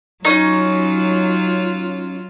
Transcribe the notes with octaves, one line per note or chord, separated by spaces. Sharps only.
F#3 C#4 D#4 F4